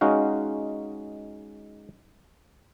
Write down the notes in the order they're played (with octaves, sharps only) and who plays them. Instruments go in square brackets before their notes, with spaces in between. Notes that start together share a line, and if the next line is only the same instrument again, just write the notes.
[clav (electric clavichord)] G#3 C#4 D#4 F#4 F5